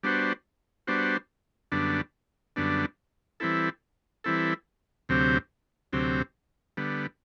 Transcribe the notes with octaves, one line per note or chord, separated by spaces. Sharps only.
G3 B3 D4 F#4 C5
G3 B3 D4 F#4 C5
F#2 D3 G3 B3 D4
F#2 D3 G3 B3 D4
E3 G3 C4 E4 A4
E3 G3 C4 E4 A4
D2 C3 F#3 C4 G4
D2 C3 F#3 C4 G4
D3 G3 B3